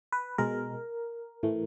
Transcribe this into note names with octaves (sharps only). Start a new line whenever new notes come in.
B4
B2 G#3 A#4
A2 E3 A3